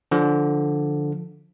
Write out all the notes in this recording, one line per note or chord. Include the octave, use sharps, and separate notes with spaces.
D3 F3